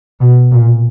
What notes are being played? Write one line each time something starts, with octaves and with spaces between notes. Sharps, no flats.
B2
A#2